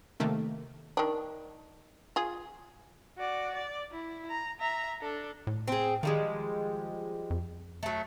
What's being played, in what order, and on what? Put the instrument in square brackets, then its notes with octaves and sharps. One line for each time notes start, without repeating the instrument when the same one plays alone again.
[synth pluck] C3 D#3 A3 A#3
[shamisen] D#3 D4
F4 G#4
[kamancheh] F#4 D5
D5
E4
A#5
E5 A#5
D4 A4
[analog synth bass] A2
[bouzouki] C4 G#4
[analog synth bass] D#3 [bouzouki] F3 G3 G#3
[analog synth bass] F2
[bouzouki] F#3 A3